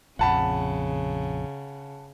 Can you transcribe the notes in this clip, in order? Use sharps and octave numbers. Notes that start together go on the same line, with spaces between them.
A#1 F2 C#3 F#5 A5 B5